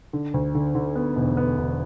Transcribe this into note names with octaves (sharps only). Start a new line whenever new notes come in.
D3
D2
D3
D3
B3
E1
B3
E1